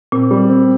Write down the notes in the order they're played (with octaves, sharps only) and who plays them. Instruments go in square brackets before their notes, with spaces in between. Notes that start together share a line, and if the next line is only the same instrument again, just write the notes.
[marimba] A#2 [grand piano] C4
[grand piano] G3
C4